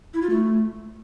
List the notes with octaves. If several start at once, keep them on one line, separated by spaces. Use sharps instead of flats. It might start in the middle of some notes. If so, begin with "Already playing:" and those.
E4
F4
A3